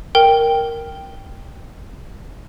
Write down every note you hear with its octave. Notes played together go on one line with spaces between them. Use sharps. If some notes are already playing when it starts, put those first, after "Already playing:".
A#4 G5